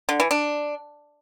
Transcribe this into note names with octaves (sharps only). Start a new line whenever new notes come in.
D3
E3
D4